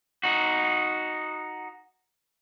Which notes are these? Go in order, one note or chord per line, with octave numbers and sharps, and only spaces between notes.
D#4 F#4